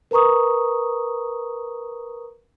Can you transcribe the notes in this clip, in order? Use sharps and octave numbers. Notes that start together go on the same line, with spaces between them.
A#4 B4 A#5 C#6 D#6